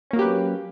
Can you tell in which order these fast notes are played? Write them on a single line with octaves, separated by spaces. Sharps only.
C#4 A#3 F#3 G4 B4